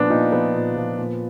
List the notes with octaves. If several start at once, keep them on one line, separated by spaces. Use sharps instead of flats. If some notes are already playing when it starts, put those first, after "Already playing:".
Already playing: A#2 F3 B3 D4
A#2 D#4
F3 B3
A#2
F3
A#2